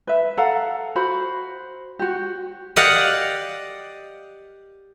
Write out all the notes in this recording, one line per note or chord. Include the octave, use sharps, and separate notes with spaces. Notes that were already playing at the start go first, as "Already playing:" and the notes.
B4 E5
A4 F5 F#5 A#5
F#4 C5 B5
F#4 G4
G4 D5 D#5 F5 F#5